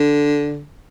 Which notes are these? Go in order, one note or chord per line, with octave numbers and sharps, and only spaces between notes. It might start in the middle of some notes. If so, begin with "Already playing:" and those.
Already playing: D3